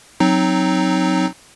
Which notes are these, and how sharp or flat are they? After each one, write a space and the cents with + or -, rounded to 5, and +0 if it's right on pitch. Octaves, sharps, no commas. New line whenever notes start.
F#3 +0 C4 +0 D#4 +0